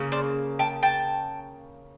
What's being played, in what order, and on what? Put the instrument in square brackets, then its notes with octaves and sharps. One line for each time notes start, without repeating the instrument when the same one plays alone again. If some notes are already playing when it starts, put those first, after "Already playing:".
Already playing: [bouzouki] C#3 A#3
C5 D5
G5 A5
G5 A5